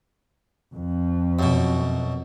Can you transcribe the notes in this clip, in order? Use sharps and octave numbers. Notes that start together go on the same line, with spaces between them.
F2
F#2 B2